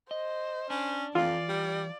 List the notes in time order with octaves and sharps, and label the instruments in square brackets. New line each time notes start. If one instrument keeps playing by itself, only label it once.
[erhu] C5 [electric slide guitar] D#5
[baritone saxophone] C#4 [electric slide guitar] D4
[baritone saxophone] F2 [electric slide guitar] E3 [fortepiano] F4 [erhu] D5
[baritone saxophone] G3